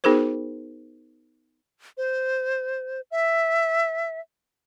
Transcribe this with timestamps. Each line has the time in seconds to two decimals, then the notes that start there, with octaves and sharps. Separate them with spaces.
0.04 B3 D#4 F#4 G#4 A#4 C5
1.97 C5
3.11 E5